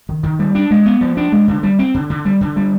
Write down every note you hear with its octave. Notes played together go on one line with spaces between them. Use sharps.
D#3
D#3
G3
D4
G#3
B3
F3
D4
G#3
D3
G3
C4
D3
D3
G3
D3
G3